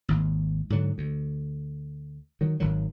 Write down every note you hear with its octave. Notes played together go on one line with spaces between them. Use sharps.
G#1 D#2
G#2 D3 F#3
D2
D#3 F#3
G#1 D#3 F#3